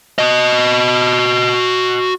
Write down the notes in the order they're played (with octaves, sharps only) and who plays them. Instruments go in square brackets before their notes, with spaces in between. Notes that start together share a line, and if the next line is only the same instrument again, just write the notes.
[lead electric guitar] F#4 D#5